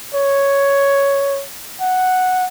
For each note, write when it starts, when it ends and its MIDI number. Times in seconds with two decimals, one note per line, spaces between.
0.14 1.43 73
1.81 2.46 78